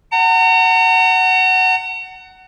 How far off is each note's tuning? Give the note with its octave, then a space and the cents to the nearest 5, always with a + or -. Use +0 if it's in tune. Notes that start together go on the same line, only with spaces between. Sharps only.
F#5 +15 A#5 -45